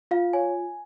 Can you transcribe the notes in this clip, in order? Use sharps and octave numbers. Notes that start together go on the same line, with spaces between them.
F4 F5
C#5 G#5